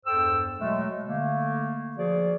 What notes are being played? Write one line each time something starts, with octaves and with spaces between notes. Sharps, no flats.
E2 G2 A4 C5 G5 E6
B2 F#3 G#3 A3
D3 A3 A#3
F3 F#4 G#4 D5